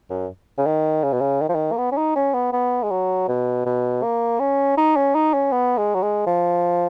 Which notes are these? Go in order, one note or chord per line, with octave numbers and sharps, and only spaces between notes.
F#2
C#3
D#3
C#3
B2
C#3
D#3
F3
D#3
A#3
B3
C#4
D#4
C#4
B3
B3
G#3
F#3
B2
B2
A#3
C#4
D#4
C#4
D#4
C#4
B3
G#3
F#3
G#3
F3